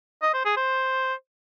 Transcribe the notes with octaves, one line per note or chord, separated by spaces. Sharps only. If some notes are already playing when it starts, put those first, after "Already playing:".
D#5
C5
G#4
C5